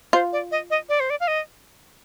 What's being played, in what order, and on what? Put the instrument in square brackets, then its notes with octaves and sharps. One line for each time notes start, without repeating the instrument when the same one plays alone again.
[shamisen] F4 [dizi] C5
[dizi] D5
D#5
D#5
D5
C5
D5
F5
D#5